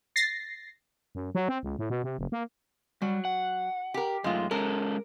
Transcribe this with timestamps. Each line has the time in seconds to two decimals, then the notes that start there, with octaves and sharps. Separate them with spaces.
0.16 A6 A#6 C7
1.15 F#2
1.35 F#3
1.49 C4
1.63 C#2
1.79 A2
1.90 B2
2.04 C3
2.19 F#1
2.32 A#3
3.02 F#3 G3
3.25 F#5
3.94 G4 A#4
4.24 F#2 G#3 A3 F4
4.51 G#3 C#4 A4 A#4